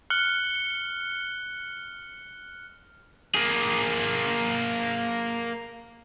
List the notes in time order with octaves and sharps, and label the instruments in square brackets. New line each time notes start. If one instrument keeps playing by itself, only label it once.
[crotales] F6 F#6 C#7 F#7 G7
[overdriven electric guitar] A#3 G#4